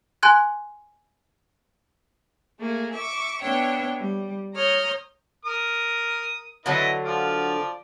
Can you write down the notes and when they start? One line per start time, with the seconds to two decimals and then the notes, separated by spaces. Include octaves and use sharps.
0.23 G#5 C6 F#6 G#6
2.59 A3 A#3 G#4
2.94 E5 C#6 D6
3.42 B3 D4 C#5 E5 G5
3.99 G3
4.53 C#5 A#5 D#6 F6 G6
5.45 A#4 D#6
6.66 D3 F#3 E4 B4 D#5
7.04 F3 F4 D5